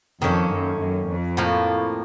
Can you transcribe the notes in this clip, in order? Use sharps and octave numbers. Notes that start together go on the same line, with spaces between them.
F2 D#3 A#3 C#4 A4
F#2
F#2
F2
A2 F3 A#3